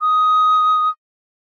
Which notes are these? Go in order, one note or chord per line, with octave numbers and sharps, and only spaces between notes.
D#6